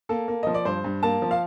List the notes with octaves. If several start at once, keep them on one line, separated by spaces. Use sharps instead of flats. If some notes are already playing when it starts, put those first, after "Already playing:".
A#3 A4
A#3
F3 D#5
D5
G2 C5
G2
A#3 A5
F3
F5